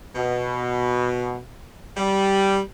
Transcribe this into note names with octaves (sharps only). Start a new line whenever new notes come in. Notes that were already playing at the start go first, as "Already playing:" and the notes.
B2
G3